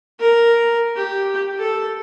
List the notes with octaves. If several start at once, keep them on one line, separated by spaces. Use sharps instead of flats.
A#4
G4
A4